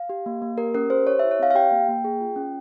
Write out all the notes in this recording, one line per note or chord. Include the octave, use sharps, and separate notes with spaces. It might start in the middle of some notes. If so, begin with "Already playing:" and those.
Already playing: F5
G4
A#3
A#3
G4 A#4
C#4 A#4
G4 C5
G4 C#5
E4 E5
C#5
C4 F5
F5
G4 G5
A#3
A#3
G#4
F4
C#4